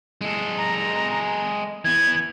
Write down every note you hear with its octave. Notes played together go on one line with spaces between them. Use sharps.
G#3 A4
A#5
E3 B3 G#6